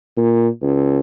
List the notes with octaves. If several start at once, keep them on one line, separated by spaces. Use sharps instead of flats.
A#2
C#2